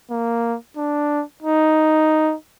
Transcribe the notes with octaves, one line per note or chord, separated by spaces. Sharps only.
A#3
D4
D#4